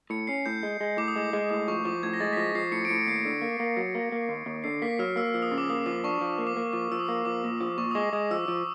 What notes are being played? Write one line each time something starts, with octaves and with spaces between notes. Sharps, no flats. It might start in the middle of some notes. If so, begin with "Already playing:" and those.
A2 C#7
C#4 C7
A2 G6
G#3
G#3
A2 D6
D#6
G#3 D6
G#3
A2 D6
F3 C#6
F3 D6
A2 G#6
A#6
G#3 A6
B6
F3 A#6
F3 C7
A2 C#7
D7
A2 C#7
D#2 C7
D3
A#3
A#3
F#3
A#3
A#3
D#2
D#2
D3 C7
A#3 B6
F#3 F6
A#3 E6
F3
D#6
C#3
D6
A#3 D#6
F3 D6
D4 C#6
F3
A#3
D6
A#3
F3 D6
F3 E6
D#6
A#3
F3 D6
A#2
F3
A#2 C#6
D#6
G#3 D6
G#3 D#6
F3 E6
F3